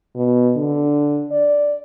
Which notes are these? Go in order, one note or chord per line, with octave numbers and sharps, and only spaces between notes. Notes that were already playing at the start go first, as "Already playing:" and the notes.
B2
D3
D5